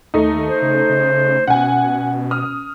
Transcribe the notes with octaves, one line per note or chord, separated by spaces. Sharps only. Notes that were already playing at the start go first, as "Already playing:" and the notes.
D#2 A3 D#4
C5
C#3
C#3
B2 C#4 F#5 G#5
D#6 F6